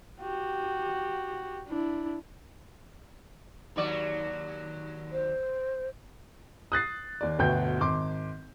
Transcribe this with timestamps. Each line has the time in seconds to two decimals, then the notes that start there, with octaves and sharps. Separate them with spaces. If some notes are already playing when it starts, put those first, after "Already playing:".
0.21 F#4 G4
1.68 D4 E4
3.76 D#2 F#3 D5
5.12 C5
6.72 D#6 F#6 A6 C7
7.21 D#2 D5
7.39 G1 D2 B2 F#4 G5 G6
7.81 G#1 C6 D6